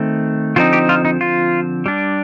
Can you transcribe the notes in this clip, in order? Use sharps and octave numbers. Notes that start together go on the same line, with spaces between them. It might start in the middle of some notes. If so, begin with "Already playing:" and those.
Already playing: D#3 A3 C4
D3 F3 C4 D#4 F4
G4
F4
D#4
F4
G3 D4